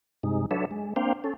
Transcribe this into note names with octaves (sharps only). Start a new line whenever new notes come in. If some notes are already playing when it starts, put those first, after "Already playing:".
G2 C3 G#3 D#4
F#3 D4 A4 B4 C#5 E5
G#3
A#3 C4 D4 C5 F5 G5
C#4 A4